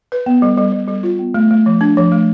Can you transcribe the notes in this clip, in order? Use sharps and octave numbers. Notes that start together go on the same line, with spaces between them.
B4
B3
G3
G3
G3
G3
F4
B3
A3
A3
F3
D4
F3
A3